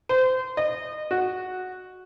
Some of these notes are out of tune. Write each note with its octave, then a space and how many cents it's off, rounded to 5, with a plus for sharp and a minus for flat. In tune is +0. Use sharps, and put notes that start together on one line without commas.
C5 -25
D#5 -25
F#4 -5